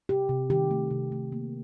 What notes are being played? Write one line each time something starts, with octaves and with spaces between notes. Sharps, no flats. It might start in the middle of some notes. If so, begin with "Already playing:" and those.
C3 G4
C3
D#3 G4
A3
C3
A3
A#3